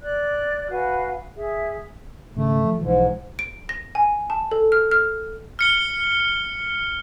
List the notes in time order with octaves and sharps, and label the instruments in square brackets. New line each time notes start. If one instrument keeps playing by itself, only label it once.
[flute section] D5 F#6
F#4 B4 F5 G#5
G#4 E5
[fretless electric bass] G#1 C#3 [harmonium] A3
[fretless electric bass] F3
[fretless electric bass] B1 E3 F3 [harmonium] G#2
[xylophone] D7
A#6
G#5
A5
A4
F6
F6
[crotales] F6 C#7 G7